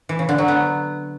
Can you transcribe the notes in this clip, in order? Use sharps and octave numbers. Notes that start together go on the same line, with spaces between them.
E3
C#3
D3
F#3
B3